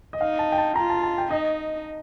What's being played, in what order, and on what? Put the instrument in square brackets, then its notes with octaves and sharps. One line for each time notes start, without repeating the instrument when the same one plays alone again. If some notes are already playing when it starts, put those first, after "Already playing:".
[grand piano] D#5
[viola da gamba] D#4 [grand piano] F5
[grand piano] A5
G5
A5
[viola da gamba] F4 [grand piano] A#5
[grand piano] A5
A5
G5
[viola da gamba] D#4 [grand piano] D#5